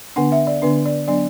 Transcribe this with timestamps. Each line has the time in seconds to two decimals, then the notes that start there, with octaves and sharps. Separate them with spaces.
0.16 D3 B3 D4 F#5
0.32 E5
0.47 D5
0.62 D3 B3 D4 B4
0.86 D5
1.08 F#3 B3 D4 D5